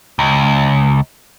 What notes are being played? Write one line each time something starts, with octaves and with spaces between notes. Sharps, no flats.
C#2